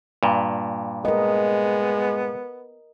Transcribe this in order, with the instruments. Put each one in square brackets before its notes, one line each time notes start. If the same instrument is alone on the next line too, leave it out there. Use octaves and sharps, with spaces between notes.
[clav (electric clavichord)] G2 A#2
[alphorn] G#3 [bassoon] B3 [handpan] A#4 D#5